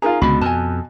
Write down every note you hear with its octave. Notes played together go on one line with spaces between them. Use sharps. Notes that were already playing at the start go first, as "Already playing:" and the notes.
D#4 F4 G#4 A#4 A#5
C#2 B2 D3 B5
F2 G#5 A5